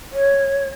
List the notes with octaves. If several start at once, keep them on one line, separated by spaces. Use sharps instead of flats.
C#5